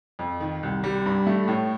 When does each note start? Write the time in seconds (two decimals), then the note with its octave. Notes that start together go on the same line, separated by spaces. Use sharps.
0.19 F2
0.40 D#3
0.63 C2
0.84 G3
1.06 G2
1.27 A3
1.48 A2